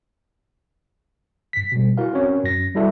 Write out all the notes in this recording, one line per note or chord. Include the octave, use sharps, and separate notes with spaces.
G2 B6
B2 G3
E4 F#4 A#4 F5
C4 C#4 F#4 A#4 C#5
F#2 A#6
G3 E4 F#4 A4 D5 E5